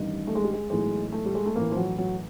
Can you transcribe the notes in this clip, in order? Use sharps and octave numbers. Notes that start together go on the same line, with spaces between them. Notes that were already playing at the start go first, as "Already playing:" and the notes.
Already playing: A1 G2 D#3
A3
G#3
G3
G#3
B1 A2 E3 G#3
A3
G3
G#3
A3
A1 A2 E3 A#3
F3
F#3
F#3